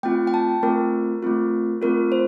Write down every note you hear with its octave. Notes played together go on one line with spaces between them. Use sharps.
A3 C4 F4 G5
G5
A5
A3 C4 F4 A#4
A3 C4 F4
A3 C4 F4 A#4
C5